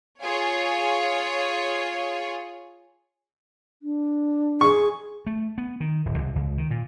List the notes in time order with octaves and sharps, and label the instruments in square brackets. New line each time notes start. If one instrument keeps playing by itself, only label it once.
[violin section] F4 G#4 C#5
[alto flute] D4
[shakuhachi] G#4 [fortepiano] C#6
[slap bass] A3
B3
D#3
D1
C2
C#2
D#3
A#2